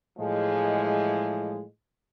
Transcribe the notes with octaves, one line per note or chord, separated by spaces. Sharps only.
A2 E3 F3 G#3